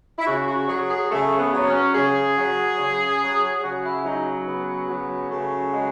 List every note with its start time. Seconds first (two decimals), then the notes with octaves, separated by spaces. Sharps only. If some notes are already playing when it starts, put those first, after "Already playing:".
0.18 E4
0.27 C#3 F#4
0.48 F#4
0.68 F#3 G#4
0.91 G#4
1.11 C#3 A3
1.39 B3
1.53 F#3
1.67 C#4
1.95 C#3 G#4
2.38 F#3
2.80 C#3
3.21 F#3
3.63 C#3 F#4
3.85 E4
4.05 F#3 D#4
4.47 C#3 B3
4.90 F#3
5.31 C#3 A3
5.74 F#3 G#3